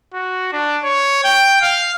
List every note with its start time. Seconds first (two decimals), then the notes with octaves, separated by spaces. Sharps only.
0.13 F#4
0.53 D4
0.83 C#5
1.24 G5
1.62 F5